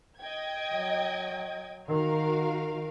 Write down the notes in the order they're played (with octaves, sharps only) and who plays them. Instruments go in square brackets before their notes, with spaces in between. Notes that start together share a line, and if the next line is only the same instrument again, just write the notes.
[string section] D#5 G5 G#6
[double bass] F#3
[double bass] D#3 [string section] F#4 A#4 F5